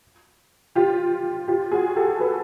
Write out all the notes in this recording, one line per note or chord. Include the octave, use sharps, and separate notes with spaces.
F4 G4
F4 G4
F#4 G#4
G4 A4
A4 B4